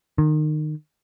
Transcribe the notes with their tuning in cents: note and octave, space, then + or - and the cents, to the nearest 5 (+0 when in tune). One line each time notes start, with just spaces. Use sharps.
D#3 -25